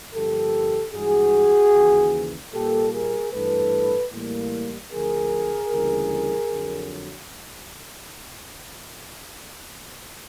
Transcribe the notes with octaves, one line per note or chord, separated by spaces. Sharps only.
G2 D3 F3 A#3 G4 A4
G2 E3 G#3 F#4 G#4
D#2 C#3 E3
A#2 G3 A#3 G4 A4
G#4 A#4
G2 E3 A3 A4 B4
A2 E3 G3 A#3
D2 D3 F3 A3 G#4 A#4
D2 C#3 E3 G3 A#3
F2 D3 F#3